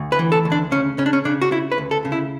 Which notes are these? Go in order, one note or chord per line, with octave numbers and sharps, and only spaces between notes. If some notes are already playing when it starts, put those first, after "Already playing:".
Already playing: D2
B4
E3
A4
D2
D4
C#3 C#4
C#3 C#4
D4
C#4
C#3 D4
F#4
C#3 E4
B4
D2
A4
C#3
E4